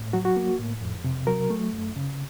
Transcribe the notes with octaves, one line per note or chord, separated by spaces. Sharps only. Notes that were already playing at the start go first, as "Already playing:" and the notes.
Already playing: A2
F#3 F#4
F#4
A#3
A2
F2
C3
F#3 A#4
A3
F#2
C#3